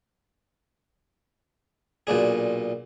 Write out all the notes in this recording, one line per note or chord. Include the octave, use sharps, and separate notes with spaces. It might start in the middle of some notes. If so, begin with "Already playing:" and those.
B1 A#2 D4 G#4